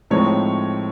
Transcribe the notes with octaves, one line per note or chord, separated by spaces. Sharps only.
A2 F3 G#3 C4 D#4 C#5